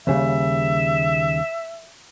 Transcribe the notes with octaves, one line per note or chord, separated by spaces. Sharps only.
D#2 C#3 G3 E5